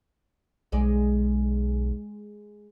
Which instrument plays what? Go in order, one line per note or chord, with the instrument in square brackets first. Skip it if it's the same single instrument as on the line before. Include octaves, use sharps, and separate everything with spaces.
[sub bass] B1 [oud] G#3 D5